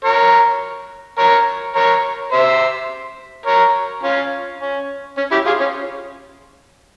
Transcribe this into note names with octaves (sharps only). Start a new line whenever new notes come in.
A#4 C#5
A#4 C#5
A#4 C#5
C5 E5
A#4 C#5
C#4 F4
C#4
C#4
E4 G4
F4 G#4
C#4